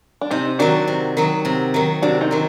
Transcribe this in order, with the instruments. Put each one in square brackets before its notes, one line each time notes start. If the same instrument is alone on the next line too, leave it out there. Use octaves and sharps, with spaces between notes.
[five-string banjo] D4
[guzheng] C3 [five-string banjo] C4 D#4
[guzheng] D#3 F#3 [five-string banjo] D4 F#4
[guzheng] C3
D#3 F#3
C3
D#3 F#3
[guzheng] C3 [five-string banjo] D4 F#4
[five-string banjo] C4 D#4
[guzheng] D#3 F#3